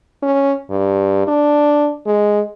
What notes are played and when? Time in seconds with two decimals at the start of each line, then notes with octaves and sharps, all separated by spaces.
0.23 C#4
0.70 G2
1.27 D4
2.07 G#3